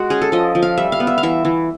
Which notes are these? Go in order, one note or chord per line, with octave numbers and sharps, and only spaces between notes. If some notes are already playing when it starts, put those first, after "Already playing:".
Already playing: G#3 F#4
C#4 G#4
A4
F3 D#5
F3
F5
G3 E5
F5
B3
E5
F5
E3 E5
E3